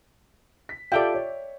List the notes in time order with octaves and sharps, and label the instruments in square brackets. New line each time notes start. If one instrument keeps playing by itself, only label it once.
[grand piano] B6
[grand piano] F4 G4 A4 [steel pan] D5 E5 G5
[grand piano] C#5